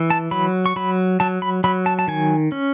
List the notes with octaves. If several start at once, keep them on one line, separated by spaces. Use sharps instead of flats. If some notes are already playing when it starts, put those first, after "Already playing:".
Already playing: E3
A5
F#3 B5
C#6
F#3 B5
F#3 A5
B5
F#3 B5
A5
A5
D#3 G#5
C#4